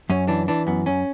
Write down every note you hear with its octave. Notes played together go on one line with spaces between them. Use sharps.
F#2 C#4
E3 D4
E3 D4
F#2 B3
F#2 C#4